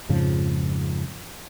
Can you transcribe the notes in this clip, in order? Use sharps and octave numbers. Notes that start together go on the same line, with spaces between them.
F2 G#2 C#3 F3